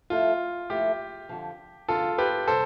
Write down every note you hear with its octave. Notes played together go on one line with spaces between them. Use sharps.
F3 A3 E4 F4 A4
F3 A3 E4 G4 A4
F2 D3 F3
F2 D3 F3 F4 A4
G4 B4
C3 G3 A4 C5